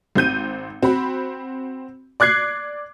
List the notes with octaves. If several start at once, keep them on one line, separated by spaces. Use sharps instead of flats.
G#1 C4 G6 D#7
C4 F#4 B5
D5 D6 F#6 G#6 C7